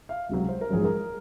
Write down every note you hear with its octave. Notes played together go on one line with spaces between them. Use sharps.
F5
C#2 C3 F#3
C5
A#4
A#1 G#2 F#3 C#4 G#4
A#4